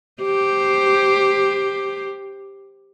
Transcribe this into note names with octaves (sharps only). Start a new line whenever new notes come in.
G4 C5